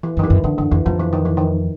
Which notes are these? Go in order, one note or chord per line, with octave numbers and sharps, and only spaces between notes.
E3
F#2 D#3
E3
F#2
F2 D3
F#2 D3
F2 E3
F2 F3
E3
D#3
E3
D#3